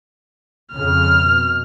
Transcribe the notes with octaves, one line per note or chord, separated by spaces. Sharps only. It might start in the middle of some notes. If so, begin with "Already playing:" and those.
F2 C#3 F6
B2